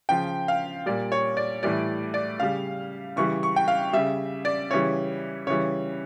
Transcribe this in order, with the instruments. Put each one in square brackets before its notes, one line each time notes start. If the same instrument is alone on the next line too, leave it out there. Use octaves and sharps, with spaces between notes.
[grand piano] C#3 F3 G5
F5
A#2 G3 D5
C#5
D5
A2 E3 G3 D5
D5
C#3 G3 F5
C#3 E3 G3 C#6
C#6
G5
F5
C#3 G3 E5
D5
C#3 E3 G3 C#5
C#3 E3 G3 C#5